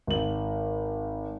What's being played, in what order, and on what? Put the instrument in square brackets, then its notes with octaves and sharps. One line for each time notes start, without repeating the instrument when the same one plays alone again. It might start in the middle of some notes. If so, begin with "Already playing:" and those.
[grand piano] G#1 F#7